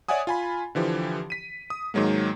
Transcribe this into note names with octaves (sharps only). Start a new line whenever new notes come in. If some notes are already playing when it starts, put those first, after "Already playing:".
C#5 D5 E5 F#5 G#5 D#6
F4 G#5 B5
D3 E3 F3 G4
B6 D#7
D#6
G#2 D#3 F#3 G#3 A#3